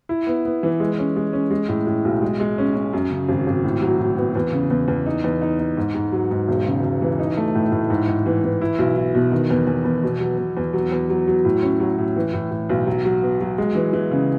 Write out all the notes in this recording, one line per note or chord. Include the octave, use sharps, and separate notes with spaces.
E4
B3
B3
E3
G#3
C#4
G#3
C#4
G#3
A2
A2
B1
G#3
G#3
C#4
C#4
F#2
C#3
G#1
G#1
A2
F#3
A2
B3
E2
C#3
E2
E2
D#4
E2
D#4
D#4
G#2
G#2
F#3
G#2
E1
C#3
E1
E3
D#4
A3
A2
A2
G#2
G#2
E3
E3
E4
B1
E4
B2
D#3
E2
E2
E2
B2
F#3
B2
E2
F#3
E2
F#3
F#3
A2
C#4
F#3
A2
E3
A2
A2
B1
F#3
F#3
B3
F#3
G#3
E3
E3
C#3